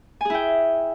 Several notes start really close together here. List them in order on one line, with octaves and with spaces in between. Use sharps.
G#5 G#4 E4 G5